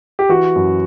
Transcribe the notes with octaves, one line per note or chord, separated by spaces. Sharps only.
G4
E3 F#4
F#2